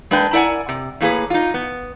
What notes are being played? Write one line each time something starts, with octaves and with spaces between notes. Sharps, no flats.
G#3 A#3 D4 B4 G5
E4 A#4 D5 F#5 G#5
C3
A2 A#3 G#4 B4
D#4 F4
B3